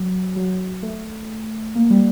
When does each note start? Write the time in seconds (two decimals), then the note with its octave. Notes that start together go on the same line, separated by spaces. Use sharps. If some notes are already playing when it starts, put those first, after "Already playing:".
Already playing: F#3
0.36 F#3
0.82 A3
1.75 A#3
1.90 G3